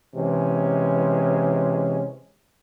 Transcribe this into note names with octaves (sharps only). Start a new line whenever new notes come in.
C3 E3 G#3 C#4